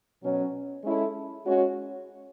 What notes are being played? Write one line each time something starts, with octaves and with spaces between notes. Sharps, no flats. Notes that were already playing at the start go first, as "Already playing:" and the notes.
B2 F#3 C#4
G#3 C#4 E4 A4
G#3 C#4 F#4 C#5